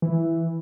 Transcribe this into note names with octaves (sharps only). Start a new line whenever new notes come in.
E3